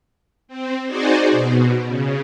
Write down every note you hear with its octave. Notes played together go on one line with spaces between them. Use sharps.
C4
D#4 F#4 G#4 C5 D5
B2
C#3